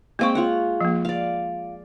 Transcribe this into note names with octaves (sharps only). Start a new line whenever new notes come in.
G#3 A#3 C4 F5 G5 C#6
F4 C#5 F#5
F3 A#3
D5 F5